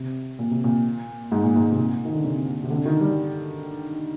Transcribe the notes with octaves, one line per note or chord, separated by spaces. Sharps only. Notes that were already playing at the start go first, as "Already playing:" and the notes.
Already playing: C3
A#2
C3
A#2
G#2
A#2
G#2
C3
A#2
D#3
D3
C3
C3
D3
D#3
G3